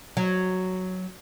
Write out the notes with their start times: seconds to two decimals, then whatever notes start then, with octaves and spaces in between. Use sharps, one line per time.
0.17 F#3